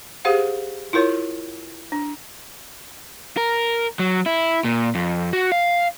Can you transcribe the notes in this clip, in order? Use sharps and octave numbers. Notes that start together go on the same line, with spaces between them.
G4 G#4 C5 F5 F#5
E4 F4 A#4 C#5
D4
A#4
F#3
E4
A#2
F2
F#4
F5